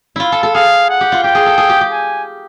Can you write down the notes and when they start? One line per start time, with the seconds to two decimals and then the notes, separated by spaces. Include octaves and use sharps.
0.16 E4 F4
0.32 A4
0.43 A4
0.54 G#4 F5
0.90 F#5
1.01 G4
1.12 F4
1.24 G4 G5
1.35 G#4
1.46 A4
1.58 G#4
1.69 G4
1.81 G4
1.92 G#5